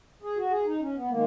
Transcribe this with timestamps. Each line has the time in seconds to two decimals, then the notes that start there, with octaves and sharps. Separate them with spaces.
0.23 G#4
0.37 F#4
0.51 G#4
0.65 D#4
0.80 C#4
0.95 B3
1.08 D#3 G#3 A#3